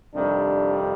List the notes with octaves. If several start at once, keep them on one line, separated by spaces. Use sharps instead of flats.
F2 C3 D#3 G3 D4